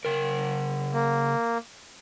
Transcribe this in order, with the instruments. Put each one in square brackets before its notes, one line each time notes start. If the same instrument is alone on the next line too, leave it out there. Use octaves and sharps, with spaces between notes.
[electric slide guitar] C#3 A#4
[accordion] A#3